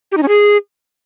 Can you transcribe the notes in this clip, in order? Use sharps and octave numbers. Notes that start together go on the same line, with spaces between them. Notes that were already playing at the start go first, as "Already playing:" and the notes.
G4
D#4
C#4
G#4